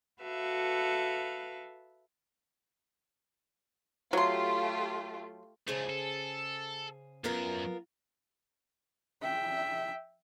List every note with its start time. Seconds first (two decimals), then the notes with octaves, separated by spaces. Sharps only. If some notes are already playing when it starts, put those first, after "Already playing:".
0.22 F#4 A4 B4 E5 F5
4.13 F#3 A3 F4 G4 C6
5.68 C#2 C#3 A3 G#4 C5
5.90 A4
7.24 F#2 B3 F4 A#4
9.22 E5 G5